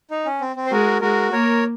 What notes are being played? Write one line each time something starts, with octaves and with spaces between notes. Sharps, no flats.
D#4
C#4
C4
C4
C5
G#3 F#4 A#4
G#3 F#4 A#4
A#3 A#4 C#5